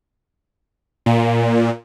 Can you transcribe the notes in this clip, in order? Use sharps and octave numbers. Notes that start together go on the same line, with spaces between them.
A#2